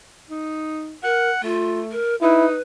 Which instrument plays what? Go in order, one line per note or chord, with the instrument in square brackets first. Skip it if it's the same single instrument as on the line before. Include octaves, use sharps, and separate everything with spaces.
[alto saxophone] D#4
[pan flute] A#4 [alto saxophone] F#5
[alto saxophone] A3 [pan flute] F4
[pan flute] A#4
[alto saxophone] D#4 [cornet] E4 [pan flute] B4